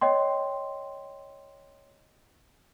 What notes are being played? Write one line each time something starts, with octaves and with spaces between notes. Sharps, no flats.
C#5 D#5 G5 C6